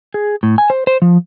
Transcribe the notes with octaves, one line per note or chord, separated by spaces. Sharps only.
G#4
A2
G#5
C5
C5
F3